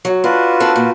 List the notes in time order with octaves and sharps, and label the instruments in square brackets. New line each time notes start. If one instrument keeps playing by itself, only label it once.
[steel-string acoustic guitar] F#3
[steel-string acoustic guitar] D4 [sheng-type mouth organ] F4 F#4 B4
[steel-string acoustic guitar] C4 D4 A4
A#2